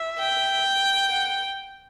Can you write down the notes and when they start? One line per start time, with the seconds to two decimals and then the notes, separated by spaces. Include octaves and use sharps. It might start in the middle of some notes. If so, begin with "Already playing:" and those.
Already playing: E5
0.18 G5
1.10 F#5